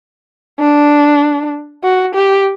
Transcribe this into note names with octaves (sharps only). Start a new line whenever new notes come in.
D4
F#4
G4